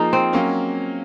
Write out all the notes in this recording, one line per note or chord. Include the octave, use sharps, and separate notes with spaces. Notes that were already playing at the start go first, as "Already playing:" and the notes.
Already playing: F3 A#3 D#4 F4 G#4
C4
F#3 A#3 C#4